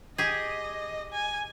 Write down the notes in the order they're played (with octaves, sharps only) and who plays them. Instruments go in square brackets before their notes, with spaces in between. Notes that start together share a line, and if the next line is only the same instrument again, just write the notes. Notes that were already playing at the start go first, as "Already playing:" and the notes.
[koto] G4 G#4 [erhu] D#5
[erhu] G#5